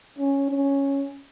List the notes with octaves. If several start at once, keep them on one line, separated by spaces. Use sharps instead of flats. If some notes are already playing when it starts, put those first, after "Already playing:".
C#4
C#4